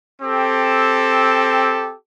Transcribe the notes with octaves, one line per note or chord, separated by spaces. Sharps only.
C4 G4 A4